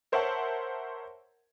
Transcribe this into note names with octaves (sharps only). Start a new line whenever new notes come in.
A#4 C5 C#5 E5 F#5 A5